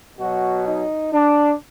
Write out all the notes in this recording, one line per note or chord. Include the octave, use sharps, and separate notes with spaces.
B2 F#3 F#4
D#4
D4